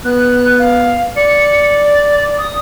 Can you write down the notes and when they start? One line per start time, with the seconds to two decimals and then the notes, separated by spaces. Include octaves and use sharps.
0.05 B3 F#6
0.59 F5
1.17 D5 C#7
1.87 A6
2.38 D#6